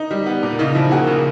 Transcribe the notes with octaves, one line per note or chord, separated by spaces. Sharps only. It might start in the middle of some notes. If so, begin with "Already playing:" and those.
Already playing: D#4
G3
B3
A#2
C#3 D#4
F3 E4
A#3 F#4 G#4
C#3